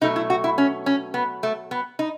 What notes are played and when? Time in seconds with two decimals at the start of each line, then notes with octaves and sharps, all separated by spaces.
0.01 B2 F#3 A3 D#4
0.16 E4
0.30 F#4
0.44 E4
0.58 C#4
0.86 C#4
1.14 B3
1.43 A3
1.71 B3
1.99 D#4